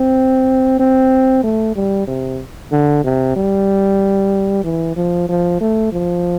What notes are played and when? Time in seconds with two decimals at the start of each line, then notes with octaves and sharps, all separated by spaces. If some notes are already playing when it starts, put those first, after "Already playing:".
Already playing: C4
0.79 C4
1.44 A3
1.76 G3
2.07 C3
2.72 D3
3.04 C3
3.36 G3
4.64 E3
4.96 F3
5.29 F3
5.60 A3
5.93 F3